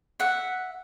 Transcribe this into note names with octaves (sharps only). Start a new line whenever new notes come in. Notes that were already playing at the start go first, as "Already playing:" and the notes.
E5 F#5